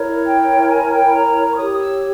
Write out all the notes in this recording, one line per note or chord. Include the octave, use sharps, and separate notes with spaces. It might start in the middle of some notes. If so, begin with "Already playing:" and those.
Already playing: E4 A#4 C#5
G5
G#5
G5
B5
A#5
C#6
G4 C#5 D#6
E6